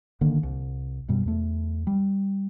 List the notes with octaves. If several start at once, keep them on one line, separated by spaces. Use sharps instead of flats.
G1 D3 D#3 A#3
C2
F#2 B2 G3
E2 A3
G3